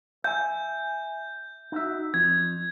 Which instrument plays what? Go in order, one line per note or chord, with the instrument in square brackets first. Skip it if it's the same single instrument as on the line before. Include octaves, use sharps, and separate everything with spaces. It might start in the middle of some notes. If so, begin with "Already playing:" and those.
[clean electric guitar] E5 G#5 [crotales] G6
[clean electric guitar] D#4 F#4 E5
[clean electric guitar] F2 [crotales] G#6